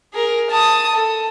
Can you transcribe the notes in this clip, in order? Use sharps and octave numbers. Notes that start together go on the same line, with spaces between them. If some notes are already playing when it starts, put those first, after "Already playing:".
G#4 A#4
A5 D#6
A4